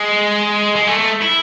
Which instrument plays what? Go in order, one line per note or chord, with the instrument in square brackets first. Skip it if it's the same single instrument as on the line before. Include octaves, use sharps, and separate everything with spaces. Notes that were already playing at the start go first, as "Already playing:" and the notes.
Already playing: [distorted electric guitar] G#3
G#3
A3
A3
E4